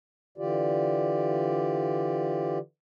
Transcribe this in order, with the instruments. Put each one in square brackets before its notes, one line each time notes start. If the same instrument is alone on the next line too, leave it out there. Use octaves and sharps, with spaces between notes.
[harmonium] D3 E3 F4 G4 D5